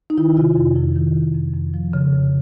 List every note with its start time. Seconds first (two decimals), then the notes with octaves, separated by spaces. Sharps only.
0.10 D#4
0.18 D#3 E4
0.37 C3 F4
0.57 F2
0.76 F2 E4
0.96 D#3
1.15 C3
1.35 F2
1.54 F2
1.74 F3
1.93 C#3
2.13 F2